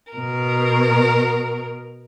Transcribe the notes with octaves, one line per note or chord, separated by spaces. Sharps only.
B2 A#4